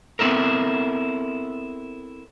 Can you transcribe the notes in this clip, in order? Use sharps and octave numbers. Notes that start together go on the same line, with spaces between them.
B3 C4 E4 A4 A#4